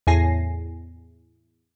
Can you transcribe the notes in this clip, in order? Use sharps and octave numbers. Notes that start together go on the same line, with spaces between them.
E2 A2 G#5 A#6 C7